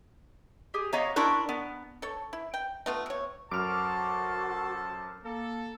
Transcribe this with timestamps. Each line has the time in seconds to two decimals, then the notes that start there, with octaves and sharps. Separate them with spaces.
0.74 G4 G#4 D#6
0.93 B3 C#5 D#5 F5 A#5 C#6
1.16 D4 E4 A#4 C6 C#6 F#6
1.49 B3 A#4
2.02 A4 C#5
2.33 E4
2.54 G5
2.86 A3 B3 F4
3.06 C3 C#5
3.52 F#2 F#4 A4 C5 A5 D6 F6
5.24 A#3 A4